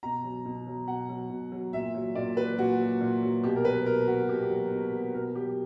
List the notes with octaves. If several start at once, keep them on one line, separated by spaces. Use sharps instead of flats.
B2 A#5
F#3
B2
F#3
B2 F#5
F#3
B2
F#3
A#2 E5
F#3
A#2 D5
F#3 B4
A#2 F#4
F#3
A#2
F#3
B2 G4
A#4
F#3 B4
B2 A#4
F#3 F#4
B2 G4
F#3
B2
F#3
B2 A#4
F#3 G4